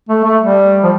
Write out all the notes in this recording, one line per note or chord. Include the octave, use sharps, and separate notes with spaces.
A3
A3
G3
F3